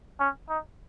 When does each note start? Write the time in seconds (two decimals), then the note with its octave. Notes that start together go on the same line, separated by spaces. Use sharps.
0.20 C#4
0.49 D#4